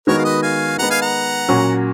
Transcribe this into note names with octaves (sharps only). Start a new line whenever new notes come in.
D#3 G#3 B3 F#4 A#4 C#5
F5
B4 D#5
F5 G#5
D#3 G#3 B3 F#5 A#5
F5 G#5
F#5 A#5
A#2 F#3 C#4 F#4